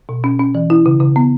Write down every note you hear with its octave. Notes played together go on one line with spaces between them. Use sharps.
B2
C#4
C#4
E3
E4
C#3
C#3
B3